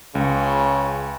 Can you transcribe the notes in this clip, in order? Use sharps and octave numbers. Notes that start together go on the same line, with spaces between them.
C#2 C#3